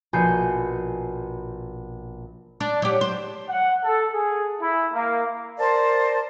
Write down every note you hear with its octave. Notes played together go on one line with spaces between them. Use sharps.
A#1 B2 G#5 G6 C7 C#7
D4
F#3 G4
C5
F#5
A4
G#4
E4
A#3
A#4 C5 D5 A5